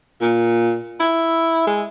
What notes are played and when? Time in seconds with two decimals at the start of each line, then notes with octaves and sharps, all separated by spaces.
0.21 A#2
1.00 E4
1.67 G#3